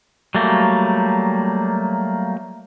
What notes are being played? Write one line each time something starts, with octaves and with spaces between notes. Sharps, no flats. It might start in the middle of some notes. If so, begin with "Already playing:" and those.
F#3 G3 A3 A#3